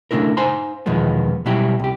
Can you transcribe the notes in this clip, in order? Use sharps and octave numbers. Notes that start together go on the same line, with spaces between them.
C#3 A3 D4 E4 A#4
D#4 C5 F5 G#5 A#5 C6
E2 B2 D#3 F3 G#3 B3
B2 F#3 G3 E4 G4
C2 G4